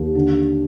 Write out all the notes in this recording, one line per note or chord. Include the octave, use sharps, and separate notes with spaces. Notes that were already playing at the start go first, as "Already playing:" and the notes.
Already playing: D#2
D3